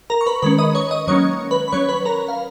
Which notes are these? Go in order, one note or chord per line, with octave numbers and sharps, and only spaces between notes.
A#4 A#5
C#6
B4 B5
D#3 G#3 C#4 B4 B5
D#5 D#6
C#5 C#6
D#5 D#6
D#3 F#3 A#3 C#4 C#5 C#6
B4 B5
B5
F#3 C#4 C#5 C#6
B4 B5
A#4 A#5
F5